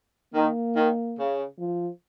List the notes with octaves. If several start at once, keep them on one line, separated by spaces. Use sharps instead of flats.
D#3 A#3
D#3
C#3
F3